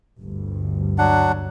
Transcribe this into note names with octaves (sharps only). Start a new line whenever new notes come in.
G1 D2 G2
F#3 D4 F#5